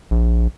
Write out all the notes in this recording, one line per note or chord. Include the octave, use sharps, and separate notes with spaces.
A#1